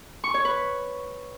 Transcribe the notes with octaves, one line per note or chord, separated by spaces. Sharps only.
C#6
C#5
B4